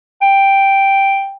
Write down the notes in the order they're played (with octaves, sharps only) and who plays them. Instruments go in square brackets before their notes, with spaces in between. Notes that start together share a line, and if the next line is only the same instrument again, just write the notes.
[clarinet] G5